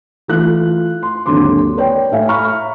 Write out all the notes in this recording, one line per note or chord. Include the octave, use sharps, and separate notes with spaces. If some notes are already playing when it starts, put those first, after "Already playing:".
E3 A3 F4 F#6
C6
G#1 D#2 D3 F#3 C6 D6
B4 C#5 D5 G5
A2 A4 E5 F5 G#5
E5 A#5 B5 C#6 F6